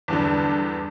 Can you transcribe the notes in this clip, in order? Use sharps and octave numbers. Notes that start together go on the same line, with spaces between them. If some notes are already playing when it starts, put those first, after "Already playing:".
E2 G2 D3